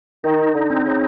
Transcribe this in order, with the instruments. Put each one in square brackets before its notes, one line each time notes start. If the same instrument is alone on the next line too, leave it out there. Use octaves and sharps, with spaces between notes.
[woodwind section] D#3 [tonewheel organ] D#4
[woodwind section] D3
[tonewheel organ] C4
[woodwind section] C#3